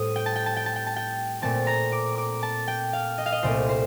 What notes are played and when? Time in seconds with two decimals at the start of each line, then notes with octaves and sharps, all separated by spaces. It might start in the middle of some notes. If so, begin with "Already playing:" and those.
Already playing: A2 G3 C4 D#6
0.16 G5
0.26 A5
0.36 G5
0.46 A5
0.57 G5
0.66 A5
0.76 G5
0.87 A5
0.96 G5
1.42 A#2 A3 C4 A5
1.67 A#5
1.92 D6
2.18 D6
2.43 A5
2.68 G5
2.93 F5
3.18 D#5
3.26 F5
3.32 D#5
3.43 C2 A#2 A3 C4 C5
3.69 C5